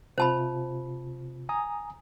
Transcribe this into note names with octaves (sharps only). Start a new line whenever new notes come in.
C3 F4 C5 A5 B5
G#5 A#5 D#6